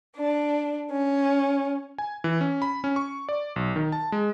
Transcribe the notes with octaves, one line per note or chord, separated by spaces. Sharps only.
D4
C#4
G#5
E3
C#4
B5
C#4
C#6
D5
B1
D#3
A5
G#3